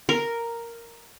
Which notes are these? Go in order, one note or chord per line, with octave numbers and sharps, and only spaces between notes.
A#4